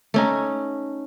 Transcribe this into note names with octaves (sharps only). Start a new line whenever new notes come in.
A3 C#4 D#4